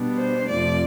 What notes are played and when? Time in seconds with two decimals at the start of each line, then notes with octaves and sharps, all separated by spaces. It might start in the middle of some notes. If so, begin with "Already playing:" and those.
Already playing: B2 G3 B3 D4
0.18 C5
0.49 F2 C3 F3 A3 D5